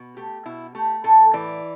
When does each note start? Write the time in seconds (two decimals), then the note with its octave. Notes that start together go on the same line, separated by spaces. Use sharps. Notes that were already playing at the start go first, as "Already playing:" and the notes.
Already playing: B2
0.17 A3 G4
0.46 B2 E4
0.75 A3 G4
1.04 A2 A4
1.33 E3 D5